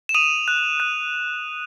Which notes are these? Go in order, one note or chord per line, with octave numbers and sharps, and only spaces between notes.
E7
D#6 D#7 F7
F#6
F#6